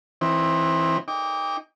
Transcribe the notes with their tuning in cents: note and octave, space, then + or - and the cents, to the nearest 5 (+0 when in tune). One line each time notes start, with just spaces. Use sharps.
E3 +0 C4 +20 D#4 +0
D#4 +0 G5 +35 D6 -15